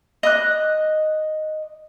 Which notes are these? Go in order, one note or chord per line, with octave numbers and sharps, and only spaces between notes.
D#5 F#6